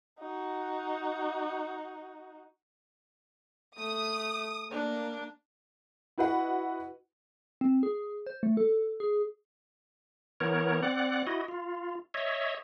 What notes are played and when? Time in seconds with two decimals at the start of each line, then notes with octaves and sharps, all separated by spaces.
0.19 D#4 F#4
3.78 A3 D#6
4.71 A#3 D4
6.18 E4 F#4 B4 D#5 F#5
7.61 C4
7.83 G#4
8.27 C5
8.43 A3
8.57 A4
9.00 G#4
10.40 E3 B3 A#4 C#5
10.83 C4 D5 F#5
11.27 E4 F#4 D#5
11.48 F4
12.14 C#5 D#5 E5